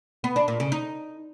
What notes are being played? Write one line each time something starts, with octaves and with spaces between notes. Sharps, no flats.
B3
D4
A#2
C#3
D#4